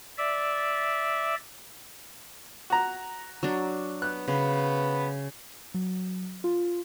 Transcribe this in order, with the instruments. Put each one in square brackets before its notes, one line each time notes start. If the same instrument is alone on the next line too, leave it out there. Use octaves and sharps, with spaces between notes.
[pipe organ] D5 E5
[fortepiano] F#4 A#5
[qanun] F#3 D4
[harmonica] B3 [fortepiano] F#6
[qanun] C#3 [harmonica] B3 B4
[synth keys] F#3
F4